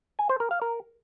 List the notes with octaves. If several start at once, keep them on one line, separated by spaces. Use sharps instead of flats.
G#5
C5
A#4
F5
A#4